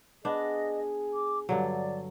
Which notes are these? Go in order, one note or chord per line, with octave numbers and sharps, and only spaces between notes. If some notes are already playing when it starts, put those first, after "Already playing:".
B3 D4 G#4 D#5
D6
G2 D3 F#3 D5